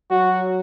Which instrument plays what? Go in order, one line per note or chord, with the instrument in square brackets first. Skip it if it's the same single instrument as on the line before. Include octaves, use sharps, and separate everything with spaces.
[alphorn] F#3 [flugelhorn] F#4